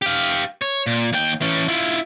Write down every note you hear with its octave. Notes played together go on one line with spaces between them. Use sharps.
G4 F5
C#5
A#2
D#2 G5
E3 C#4
E4 F4